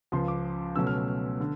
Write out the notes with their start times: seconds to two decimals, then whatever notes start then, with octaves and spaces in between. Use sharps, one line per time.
0.12 C#2 C#3 F3 C6
0.28 D6
0.76 C#2 B2 F#3 A3 C#4 E6
0.87 F6
0.98 F6
1.08 F6
1.40 D3